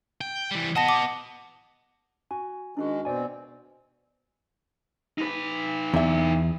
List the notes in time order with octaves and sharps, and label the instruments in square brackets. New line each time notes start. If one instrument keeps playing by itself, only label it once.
[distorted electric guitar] G5
E3 G3
[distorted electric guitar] B3 D#5 [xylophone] F#5 A5 A#6
[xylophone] D6
[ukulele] F#4 [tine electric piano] G#5
[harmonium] D#3 G#3 [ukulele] D4 E4 F#4
[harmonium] B2 C4 [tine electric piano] D5 G#5
[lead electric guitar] D#4 B4
[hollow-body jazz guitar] E2 E5